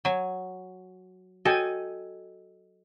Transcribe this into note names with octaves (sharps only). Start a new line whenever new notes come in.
F#3 G#5
F#4 A4 D#5 G5 G#5